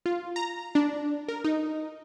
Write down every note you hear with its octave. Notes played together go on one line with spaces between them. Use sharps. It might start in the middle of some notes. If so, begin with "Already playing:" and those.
F4
A#5
D4
A#4
D#4